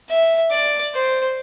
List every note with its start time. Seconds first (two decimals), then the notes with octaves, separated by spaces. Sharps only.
0.10 E5
0.52 D5
0.94 C5